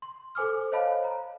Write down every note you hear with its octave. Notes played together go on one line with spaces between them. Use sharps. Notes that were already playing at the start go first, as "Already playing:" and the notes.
C6
A4 C5 G#5 D6 E6 F6
C5 C#5 D#5 F5 A5 B5
A#5